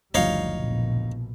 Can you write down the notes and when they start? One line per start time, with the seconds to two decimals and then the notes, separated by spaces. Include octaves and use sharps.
0.14 F#1 D2 F3 G3 D#4 C#5 F5
0.60 A#1 B2